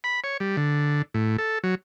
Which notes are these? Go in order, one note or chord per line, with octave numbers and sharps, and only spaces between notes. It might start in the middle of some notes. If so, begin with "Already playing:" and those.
B5
C#5
G3
D3
A2
A4
F#3